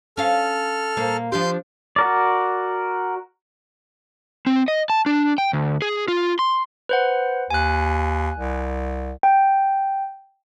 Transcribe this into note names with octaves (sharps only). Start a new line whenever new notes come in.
C#4 A4 F5 F6
A#2 A#3
F3 D4 G4 C6 G6
F#4 A#4 D5
C4
D#5
A5
D4
G5
D2
G#4
F4
C6
B4 C5 F#5
D#2 G#5 F#6
C2
G5